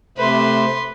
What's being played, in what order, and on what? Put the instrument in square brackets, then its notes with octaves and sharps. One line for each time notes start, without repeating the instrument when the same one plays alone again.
[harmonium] C3 A3 C5 [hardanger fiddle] B4 C6